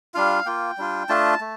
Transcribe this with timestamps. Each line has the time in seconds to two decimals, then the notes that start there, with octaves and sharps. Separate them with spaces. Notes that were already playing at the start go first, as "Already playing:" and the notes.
0.14 G3 D4 F4 F5
0.46 A#3 F4 G5
0.78 G3 D4 F4
1.09 A3 D4 F4 A5
1.41 A3